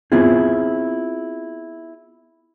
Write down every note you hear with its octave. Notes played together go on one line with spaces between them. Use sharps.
B3 C4 E4 F4 G#4